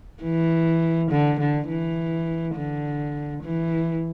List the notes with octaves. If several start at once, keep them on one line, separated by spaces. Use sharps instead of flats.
E3
D3
D3
E3
D3
E3